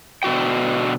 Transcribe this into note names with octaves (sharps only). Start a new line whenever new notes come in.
B2 D3 F#4 G5